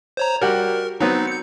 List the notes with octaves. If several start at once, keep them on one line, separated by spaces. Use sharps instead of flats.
C5 C#5 A#5
G3 F#4 G4 A#4
F#3 B3 C4 D#4
G6 C#7